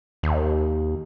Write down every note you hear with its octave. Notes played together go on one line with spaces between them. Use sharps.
D#2